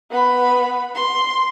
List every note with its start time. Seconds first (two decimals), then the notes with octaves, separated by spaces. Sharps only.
0.11 B3 B5
0.95 C6